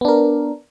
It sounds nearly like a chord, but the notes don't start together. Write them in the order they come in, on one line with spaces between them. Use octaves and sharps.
B3 D4 A#4